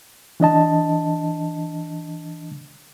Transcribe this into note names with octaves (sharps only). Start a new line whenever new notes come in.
E3 D4 D#5 A5